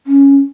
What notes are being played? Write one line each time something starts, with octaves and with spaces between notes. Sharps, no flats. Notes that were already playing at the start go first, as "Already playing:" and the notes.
C#4